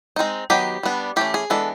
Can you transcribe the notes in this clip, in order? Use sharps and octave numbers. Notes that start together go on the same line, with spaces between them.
G#3 C4 D#4
D#3 F#3 B3 D#4 G4
G3 B3 D4
E3 A3 C#4 G4
G#4
E3 G#3 B3 D4 A4